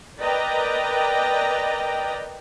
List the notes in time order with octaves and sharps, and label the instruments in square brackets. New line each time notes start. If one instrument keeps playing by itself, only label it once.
[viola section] A#4 B4 D5 D#5 G5 A#5